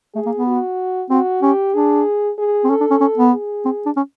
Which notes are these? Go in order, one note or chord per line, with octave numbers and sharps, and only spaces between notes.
A3 G#4
A#3
B3
F#4
C4 F#4
C#4 G4
D4 G#4
G#4
C4
C#4 A4
D4
C#4
C#4
B3
G#4
C4
D4
C#4